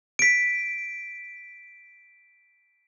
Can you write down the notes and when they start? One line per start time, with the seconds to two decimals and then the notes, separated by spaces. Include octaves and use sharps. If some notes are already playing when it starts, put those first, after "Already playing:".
0.19 B6 D7